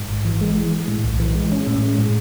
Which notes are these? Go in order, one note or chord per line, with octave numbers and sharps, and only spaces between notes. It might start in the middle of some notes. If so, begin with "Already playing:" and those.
Already playing: G#2
G#1
E3
G#3
E3
G#3
A2
B1
E3
G#3
C#4
A2
G#3
A2